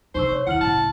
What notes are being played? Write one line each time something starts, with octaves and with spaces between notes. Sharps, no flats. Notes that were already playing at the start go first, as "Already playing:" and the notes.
C3 D4 D#4 C5 C#6 E6
C#5
D#2 E4 F#5 F6 F#7
C#2 A2 A5